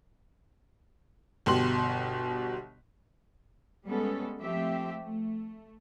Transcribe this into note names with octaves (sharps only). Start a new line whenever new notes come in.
G1 B2 G4 C6 F#7
G3 G#3 B3 C#4 A4
F3 A3 C4 G4 E5
A3